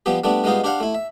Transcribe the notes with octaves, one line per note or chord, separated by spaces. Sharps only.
F3 G3 B3 G4
G3 A3 B3 D4
G3 G#3 B3 D#4 F4 C5
D4 G4 C5 F5 F#5
A3 E4
E5